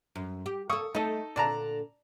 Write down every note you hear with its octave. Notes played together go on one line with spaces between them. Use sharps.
F#2
G4
A#3 A4 C#6 D#6 E6
A3 D#4 A4 D#5
A#2 D3 D5 A5 A#5